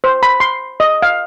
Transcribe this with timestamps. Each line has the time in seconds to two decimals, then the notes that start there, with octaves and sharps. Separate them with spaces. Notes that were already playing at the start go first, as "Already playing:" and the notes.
0.04 C5
0.23 B5
0.40 C6
0.80 D#5
1.02 F5